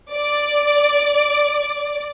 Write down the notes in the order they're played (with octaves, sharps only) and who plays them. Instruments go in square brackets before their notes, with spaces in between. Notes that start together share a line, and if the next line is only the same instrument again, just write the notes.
[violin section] D5 D6